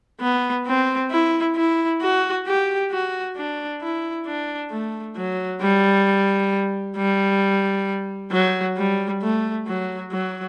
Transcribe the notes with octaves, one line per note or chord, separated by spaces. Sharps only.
B3
C4
E4
E4
F#4
G4
F#4
D4
E4
D4
A3
F#3
G3
G3
F#3
G3
A3
F#3
F#3